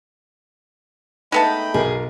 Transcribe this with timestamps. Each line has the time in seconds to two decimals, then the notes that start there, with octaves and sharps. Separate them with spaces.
1.32 G#3 A3 B3 D#4 G5 A5 B5
1.74 B1 B2 G#4 A#4